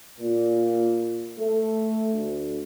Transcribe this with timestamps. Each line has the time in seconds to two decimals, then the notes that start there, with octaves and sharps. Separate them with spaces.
0.20 A#2
1.39 A3
2.13 D2